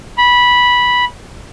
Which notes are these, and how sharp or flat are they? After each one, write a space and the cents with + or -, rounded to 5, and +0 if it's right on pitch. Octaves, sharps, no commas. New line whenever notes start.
B5 -10